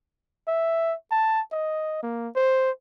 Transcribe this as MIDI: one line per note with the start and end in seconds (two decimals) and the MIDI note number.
0.48 0.95 76
1.11 1.40 81
1.52 2.02 75
2.03 2.28 58
2.35 2.71 72